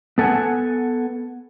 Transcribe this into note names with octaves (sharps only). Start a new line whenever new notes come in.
B3 A4 F#5 G#5